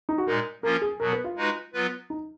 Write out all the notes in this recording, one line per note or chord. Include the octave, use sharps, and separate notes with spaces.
D#4
F#4
A#2 G#3 D#4 A#4
F3 A#3 C#4 F4 A#4
G#4
B2 F#3 B3 A#4
B4
F4
G#3 D#4 F#4 B4
F#3 B3 F4 B4
D#4